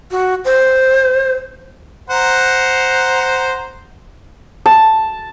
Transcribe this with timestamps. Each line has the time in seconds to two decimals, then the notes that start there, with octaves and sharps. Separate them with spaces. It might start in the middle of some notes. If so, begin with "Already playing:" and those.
0.11 F#4
0.45 C5
2.10 C5 F#5 A#5
4.66 A5